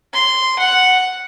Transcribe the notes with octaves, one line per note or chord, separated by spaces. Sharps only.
C6
F#5